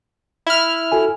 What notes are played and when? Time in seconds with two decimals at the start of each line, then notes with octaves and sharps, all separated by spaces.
0.47 E4 F6
0.92 F#4 A4 G#5